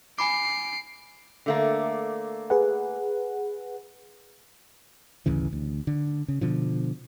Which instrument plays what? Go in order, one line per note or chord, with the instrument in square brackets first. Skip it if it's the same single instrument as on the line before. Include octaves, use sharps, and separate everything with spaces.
[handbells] G#5 B5 D6 [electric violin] C7 D7
[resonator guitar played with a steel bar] D3 A3 A#3
[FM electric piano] G#4 B4 F#5
[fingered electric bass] A1 D2 C#3 E3
D2
D3
C#3
B2 D3 F3